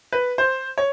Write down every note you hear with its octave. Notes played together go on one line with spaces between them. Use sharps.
B4
C5
C#5